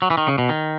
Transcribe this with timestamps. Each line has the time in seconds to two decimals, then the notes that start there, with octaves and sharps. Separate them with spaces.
0.02 F#3
0.10 E3
0.18 D#3
0.28 C#3
0.38 B2
0.49 D#3